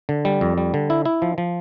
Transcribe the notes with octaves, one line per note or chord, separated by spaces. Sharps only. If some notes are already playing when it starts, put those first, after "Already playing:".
D3
G3
F2
G3
D3
E4
E4
F3
F3